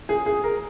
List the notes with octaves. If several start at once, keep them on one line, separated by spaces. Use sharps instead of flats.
G#4
G#4
A#4